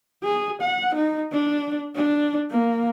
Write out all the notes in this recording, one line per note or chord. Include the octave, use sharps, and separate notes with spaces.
G#4
F#5
D#4
D4
D4
A#3